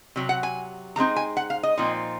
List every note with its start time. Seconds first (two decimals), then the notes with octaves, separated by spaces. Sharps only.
0.16 C3 F#3
0.29 F#5
0.43 G#5
0.96 C#3 G#3 C4 D#4 A#5
1.16 G#5
1.37 F#5
1.50 F5
1.63 D#5
1.77 A#2 F3 C4 D#4